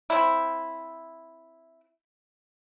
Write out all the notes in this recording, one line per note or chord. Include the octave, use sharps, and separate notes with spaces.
C4 E4